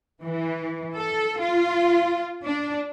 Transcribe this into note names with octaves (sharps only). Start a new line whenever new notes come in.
E3
A4
F4
D4